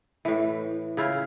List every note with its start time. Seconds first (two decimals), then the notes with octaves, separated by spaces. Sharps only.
0.25 A2 E3
0.97 C#3 E4 F4